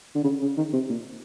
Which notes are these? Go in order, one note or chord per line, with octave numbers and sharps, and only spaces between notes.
D3
C#3
C#3
D#3
C3
A#2